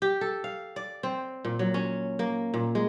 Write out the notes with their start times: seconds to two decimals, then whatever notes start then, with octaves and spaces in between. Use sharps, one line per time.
0.02 G4
0.21 A4
0.44 F5
0.76 D5
1.03 C4
1.45 A#2
1.59 F#3
1.74 C#4
2.19 A#3
2.54 A#2
2.75 G#3